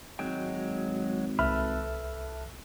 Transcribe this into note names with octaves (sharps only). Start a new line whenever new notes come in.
G#1 F#3 G#3 G5
C2 A4 B4 E5 B5 F6